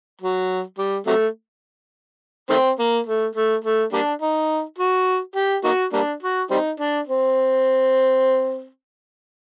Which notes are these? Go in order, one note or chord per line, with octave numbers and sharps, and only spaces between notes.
F#3
G3
C3 F#3 A3
D#3 A3 C4
A#3
A3
A3
A3
G3 A#3 D4
D#4
F#4
G4
A#3 D#4 F#4
G3 A#3 D4
F#4
G3 C4 D#4
D4
C4